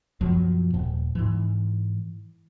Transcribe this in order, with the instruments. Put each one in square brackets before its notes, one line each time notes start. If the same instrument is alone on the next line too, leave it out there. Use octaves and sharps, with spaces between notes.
[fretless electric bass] F#2 B2 F3 F#3
D#1
G#2 E3